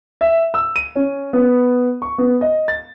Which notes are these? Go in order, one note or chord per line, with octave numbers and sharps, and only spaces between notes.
E5
E6
D#7
C#4
B3
C#6
B3
D#5
A6